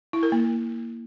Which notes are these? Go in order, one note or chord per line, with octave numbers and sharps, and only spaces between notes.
E4
A#4
A#3